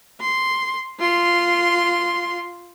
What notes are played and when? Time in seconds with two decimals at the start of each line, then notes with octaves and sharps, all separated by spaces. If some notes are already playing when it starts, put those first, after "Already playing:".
0.21 C6
0.99 F4 C6